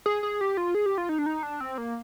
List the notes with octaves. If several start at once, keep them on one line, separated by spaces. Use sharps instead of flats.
G#4
G#4
G4
F4
G#4
G4
F4
D#4
D4
D#4
D4
C4
A#3